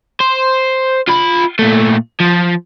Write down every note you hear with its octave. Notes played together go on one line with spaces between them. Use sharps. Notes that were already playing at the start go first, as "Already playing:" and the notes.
C5
F4 B5
A#2 A3
F3